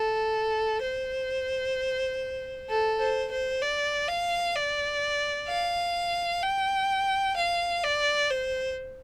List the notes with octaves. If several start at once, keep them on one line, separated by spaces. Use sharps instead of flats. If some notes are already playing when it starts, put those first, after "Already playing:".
Already playing: A4
C5
A4
C5
C5
D5
F5
D5
F5
G5
F5
D5
C5